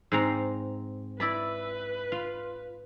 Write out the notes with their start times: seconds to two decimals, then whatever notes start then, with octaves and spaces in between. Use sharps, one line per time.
0.12 G#2 C4 A#5
1.20 E4 B4 D5 B5
2.12 F4